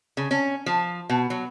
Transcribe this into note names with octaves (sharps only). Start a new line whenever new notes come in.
C#3
C#4
F3
B2
F#3